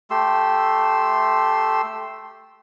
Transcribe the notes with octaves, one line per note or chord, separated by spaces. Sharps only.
A3 G4 C6 E6